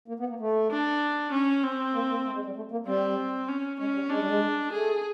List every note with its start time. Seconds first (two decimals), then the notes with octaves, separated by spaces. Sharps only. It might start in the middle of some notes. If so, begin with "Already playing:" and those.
0.08 A#3
0.20 B3
0.29 A#3
0.40 A3
0.71 D4
1.32 C#4
1.64 C4
1.94 A#3
2.10 A#3
2.26 A3
2.35 G#3
2.46 G3
2.56 A3
2.71 A#3
2.86 G3 C4
3.49 C#4
3.80 G#3 C#4
3.95 G3
4.10 G#3 D4
4.20 G3
4.27 G#3
4.72 A3 G#4